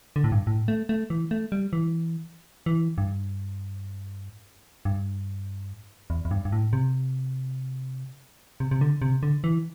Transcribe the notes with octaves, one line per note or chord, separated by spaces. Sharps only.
D3
A2
G2
A2
A3
A3
E3
A3
G3
E3
E3
G2
G2
E2
E2
G2
G2
A2
C3
C3
C3
D3
C3
D3
E3